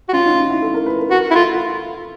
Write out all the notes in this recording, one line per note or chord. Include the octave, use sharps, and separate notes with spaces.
F#4
C#4 F4
D#4
D#4
E4
A4
A#4
B4
A#4
F#4 A#4
E4
F4 A4